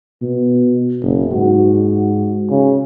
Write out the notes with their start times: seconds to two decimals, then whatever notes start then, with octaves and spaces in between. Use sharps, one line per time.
0.22 B2
1.03 F#1
1.32 G#2 F#4
2.50 C#3